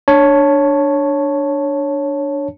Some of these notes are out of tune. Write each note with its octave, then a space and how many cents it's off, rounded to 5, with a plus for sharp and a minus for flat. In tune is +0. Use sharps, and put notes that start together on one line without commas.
D4 +0 C#5 +0 A5 +0